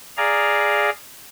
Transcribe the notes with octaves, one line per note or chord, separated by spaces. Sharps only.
G#4 D5 F5 A#5